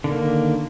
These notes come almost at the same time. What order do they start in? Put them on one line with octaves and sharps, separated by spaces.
D3 D#3 A#3